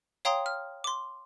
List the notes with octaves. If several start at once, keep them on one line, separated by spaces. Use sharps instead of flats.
C#5 F5 G5 A#5 C6 D#6
F6
C6 D6